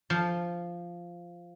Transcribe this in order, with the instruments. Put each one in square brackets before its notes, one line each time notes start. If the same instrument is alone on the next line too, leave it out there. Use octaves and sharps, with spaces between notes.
[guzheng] F3